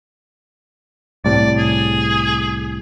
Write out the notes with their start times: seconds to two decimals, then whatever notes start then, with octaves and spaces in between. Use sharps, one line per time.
1.25 C2 A2 C3 D5
1.58 G#4